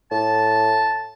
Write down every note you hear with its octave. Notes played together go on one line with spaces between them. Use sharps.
A2 A5